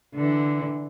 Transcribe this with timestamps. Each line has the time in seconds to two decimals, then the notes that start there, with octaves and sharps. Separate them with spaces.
0.15 D3 E3